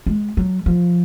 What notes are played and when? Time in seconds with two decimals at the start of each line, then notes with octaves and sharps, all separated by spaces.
0.06 G#3
0.37 F#3
0.66 F3